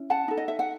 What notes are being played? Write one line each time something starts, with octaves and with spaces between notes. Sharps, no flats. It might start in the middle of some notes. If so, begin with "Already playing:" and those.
Already playing: C#4 E4
F#5 A5
D#4 A4
D#5
E5
F#5